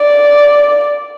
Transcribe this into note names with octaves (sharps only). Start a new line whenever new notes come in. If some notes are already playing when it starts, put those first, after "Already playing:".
Already playing: D5